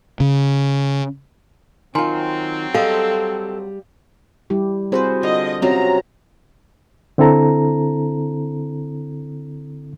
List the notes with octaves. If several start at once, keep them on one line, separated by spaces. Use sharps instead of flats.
C#3
D#3 F#3 C4 F4 G#5 A#5 C6
G3 G#4 A4 D#5 F5
G3 E4 G4
C4 E4 F#4 G#4 B4 C5
D3 F4 D#5
C3 F#3 C4 C#4 F4 F#4 A#5
D3 C4 E4 A4 A#5